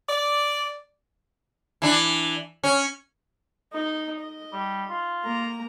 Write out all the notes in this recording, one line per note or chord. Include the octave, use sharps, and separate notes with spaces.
D5
E3 D4
C#4
D#4 D#5
D#5
G3
F4
A#3 A#5